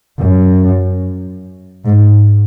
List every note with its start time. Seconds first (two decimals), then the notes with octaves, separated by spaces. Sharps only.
0.19 F#2
1.85 G#2